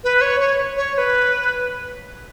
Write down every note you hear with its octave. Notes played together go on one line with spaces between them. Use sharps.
B4
C#5
C#5
C#5
C#5
B4